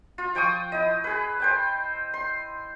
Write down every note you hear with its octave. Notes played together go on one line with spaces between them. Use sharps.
F4
F3 G5 C#6 D#6
E4 D#5
G#4 B4
C5 G5 A5
C6